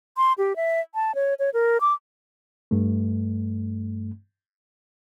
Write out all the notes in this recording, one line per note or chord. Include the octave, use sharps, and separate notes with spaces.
C6
G4
E5
A5
C#5
C#5
A#4
D6
G2 A3